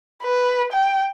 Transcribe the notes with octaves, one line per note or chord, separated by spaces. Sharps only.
B4
G5